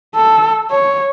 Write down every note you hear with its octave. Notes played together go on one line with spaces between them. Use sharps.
A4
C#5